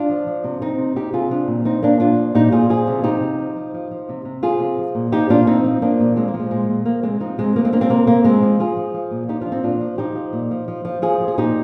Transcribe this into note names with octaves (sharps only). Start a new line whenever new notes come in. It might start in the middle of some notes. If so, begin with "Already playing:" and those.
Already playing: D4 F4
F3
F3
C3
C3 C4 D#4
C3
C3 D#4 G4
C3 F4 G#4
F3 D4 F4
A#2
F3 C4 D#4
F3 A#3 D4
A#2 D4 F4
F3
A#2 D#4 G4
A#2 F4 G#4
F3 F4 G#4
C3
C3 D#4 G4
F3
F3
F3
F3
F3
C3
C3
F3 F4 G#4
C3
F3
A#2
F3 D#4 G4
A#2 D4 F4
F3 C4 D#4
F3
F3 A#3 D4
A#2
F3 G#3 C4
A#3
F3
G#3
A#2 G#3
A#2
F3 A#3
C3 G#3 C4
F3 C4 D#4
C3 G#3 C4
F3 A#3
G#3 C4
F3 A#3 D4
G#3 C4
C3 A#3
C3 A#3
F3 G#3 C4
F3
F3 F4 G#4
F3
F3
A#2
F3 D#4 G4
D4 F4
F3
C4 D#4
A#2 D4 F4
F3
F3 D#4 G4
F3
A#2
F3
F3
F3
F3 F4 G#4
F3
G#4
A#2 D#4 G4